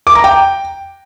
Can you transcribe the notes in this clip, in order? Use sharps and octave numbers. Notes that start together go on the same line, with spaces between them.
D6
A#5
G5